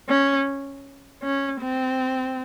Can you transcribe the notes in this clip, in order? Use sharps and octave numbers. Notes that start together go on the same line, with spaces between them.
C#4
C#4
C4